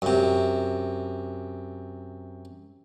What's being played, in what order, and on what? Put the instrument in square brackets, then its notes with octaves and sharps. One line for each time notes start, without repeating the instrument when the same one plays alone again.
[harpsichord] F#2 C3